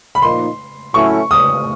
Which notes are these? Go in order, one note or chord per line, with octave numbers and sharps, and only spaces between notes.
B5
A#2 F3 A#3 D#4 C6
A2 F#3 A3 C#4 E4 C#6
D#6